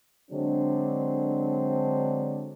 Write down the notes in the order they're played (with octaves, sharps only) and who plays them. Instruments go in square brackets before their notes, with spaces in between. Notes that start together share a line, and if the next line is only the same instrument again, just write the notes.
[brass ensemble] D3 F#3 G#3 C4 D4